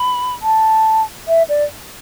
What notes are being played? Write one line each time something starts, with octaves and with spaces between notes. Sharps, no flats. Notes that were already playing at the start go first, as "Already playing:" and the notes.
Already playing: B5
A5
E5
D5